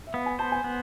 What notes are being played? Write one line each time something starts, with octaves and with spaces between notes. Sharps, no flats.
E5
B3 F5
G#5
C5 A5
G#5
B3